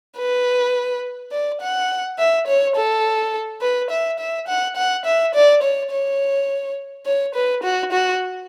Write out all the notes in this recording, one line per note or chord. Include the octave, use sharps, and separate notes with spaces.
B4
D5
F#5
E5
C#5
A4
B4
E5
E5
F#5
F#5
E5
D5
C#5
C#5
C#5
B4
F#4
F#4